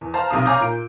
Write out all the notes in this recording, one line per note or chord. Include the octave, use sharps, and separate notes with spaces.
E2
C5 F5 A5 A#5
B1 C3 F5 D#6
C#5 F5 G#5 A#5 D6 G6
A#2 D7